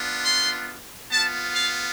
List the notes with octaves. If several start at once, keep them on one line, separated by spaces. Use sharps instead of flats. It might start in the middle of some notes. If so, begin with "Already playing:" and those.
Already playing: B3 D4 F4
C6
B3 F4 A5
F5